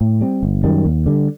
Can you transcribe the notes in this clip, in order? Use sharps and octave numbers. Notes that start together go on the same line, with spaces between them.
A2
G3 C4
G1
F#2 D#3 G3
D#2
D3 G3